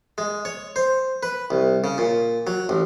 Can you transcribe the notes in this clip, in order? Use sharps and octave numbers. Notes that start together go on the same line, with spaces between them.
G#3
C#5
C5
B4
C2
C#3
A#2
F#3
A1